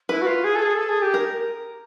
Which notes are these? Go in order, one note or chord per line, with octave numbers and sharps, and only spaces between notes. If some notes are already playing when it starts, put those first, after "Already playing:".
E4 B4
F#4
F4
G#4
A4
G#4
A4
G#4
G4
A#4